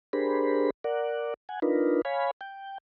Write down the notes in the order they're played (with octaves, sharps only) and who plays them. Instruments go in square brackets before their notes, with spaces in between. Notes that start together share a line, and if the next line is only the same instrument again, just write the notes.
[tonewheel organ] D4 G4 G#4 A#4 C5 B5
A#4 D5 F#5
F#5 G#5
D4 D#4 F4 A#4 B4
C#5 F5 G#5 B5
G5